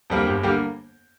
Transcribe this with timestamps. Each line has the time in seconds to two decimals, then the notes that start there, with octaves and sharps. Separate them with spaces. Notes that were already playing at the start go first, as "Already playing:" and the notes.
0.10 F2 D3 G3 A#3
0.26 G1 G4
0.43 D3 G3 A#3 G4